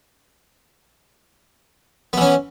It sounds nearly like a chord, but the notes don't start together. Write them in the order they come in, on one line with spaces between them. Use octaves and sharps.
B3 E3 C#4